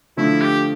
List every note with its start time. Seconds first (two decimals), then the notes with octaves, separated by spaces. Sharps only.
0.17 D3 F3 A3 E4
0.41 G4